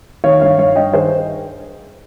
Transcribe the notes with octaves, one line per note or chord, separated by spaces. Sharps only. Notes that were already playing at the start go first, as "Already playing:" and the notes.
D#3 C#5 F5
G2 C#5 F5
G2 C#5 F5
G2 D#5 G5
D#3 G#4 C5